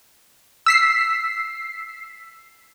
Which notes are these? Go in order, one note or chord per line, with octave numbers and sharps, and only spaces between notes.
E6 B6 C7